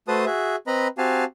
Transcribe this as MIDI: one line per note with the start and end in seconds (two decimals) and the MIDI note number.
0.08 0.25 57
0.08 0.25 66
0.08 0.25 71
0.08 0.25 72
0.08 0.25 81
0.08 0.25 87
0.26 0.56 66
0.26 0.56 68
0.26 0.56 76
0.67 0.88 60
0.67 0.88 71
0.67 0.88 75
0.67 0.88 82
0.67 0.88 83
0.98 1.24 60
0.98 1.24 66
0.98 1.24 67
0.98 1.24 77
0.98 1.24 80
0.98 1.24 81